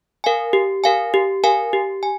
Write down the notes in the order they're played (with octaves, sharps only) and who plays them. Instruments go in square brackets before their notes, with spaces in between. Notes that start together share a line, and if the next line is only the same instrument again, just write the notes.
[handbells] A#4 F5 G#5
G4
A#4 F5 G#5
G4
A#4 F5 G#5
G4
G#5